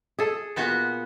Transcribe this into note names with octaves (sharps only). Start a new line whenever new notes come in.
G#4 A4
A#2 B3 F#4